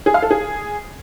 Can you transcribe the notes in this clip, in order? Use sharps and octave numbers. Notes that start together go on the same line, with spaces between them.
G#4
F5
A4
G#4